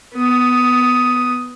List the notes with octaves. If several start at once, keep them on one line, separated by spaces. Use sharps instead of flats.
B3 D#6